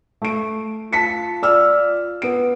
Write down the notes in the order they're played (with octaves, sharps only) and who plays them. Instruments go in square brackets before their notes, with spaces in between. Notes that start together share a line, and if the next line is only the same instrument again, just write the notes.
[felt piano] A3 D7
[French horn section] F4 [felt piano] A5 B6 C#7
[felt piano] D5 E6 F6
B3 D7